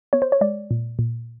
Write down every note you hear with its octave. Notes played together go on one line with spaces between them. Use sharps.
B3 C#5
C5
C#5
G#3 D5
A#2
A#2